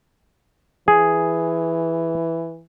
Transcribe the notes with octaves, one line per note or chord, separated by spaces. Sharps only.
E3 G#4